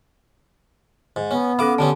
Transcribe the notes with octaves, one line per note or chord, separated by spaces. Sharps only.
G#2
B3 C#4
C#4 A4 F5 B5 D6
D3 G3 C#4 A5